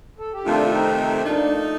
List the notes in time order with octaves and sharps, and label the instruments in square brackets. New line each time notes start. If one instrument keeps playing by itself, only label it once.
[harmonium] A4
G4
[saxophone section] F2 C3 D#3 A3 [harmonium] D4 F4
[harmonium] C4 D#4
C4 D#4
C4
[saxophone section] F3 A3 D#4 [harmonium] A#3 D4